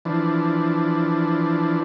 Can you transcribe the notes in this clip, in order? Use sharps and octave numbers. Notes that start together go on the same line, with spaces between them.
E3 F3 D4